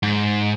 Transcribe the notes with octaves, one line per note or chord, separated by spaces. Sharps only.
G#2